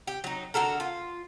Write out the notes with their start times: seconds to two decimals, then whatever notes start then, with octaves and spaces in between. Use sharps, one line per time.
0.07 G4
0.24 F#3 D#4
0.54 D3 F#4 A4 A#4
0.80 F4